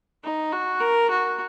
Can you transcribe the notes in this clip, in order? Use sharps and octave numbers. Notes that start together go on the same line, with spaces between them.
D#4
F#4
A#4
F#4